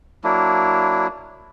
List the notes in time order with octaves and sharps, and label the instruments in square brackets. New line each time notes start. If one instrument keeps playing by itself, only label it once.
[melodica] F#3 A#3 D4 E4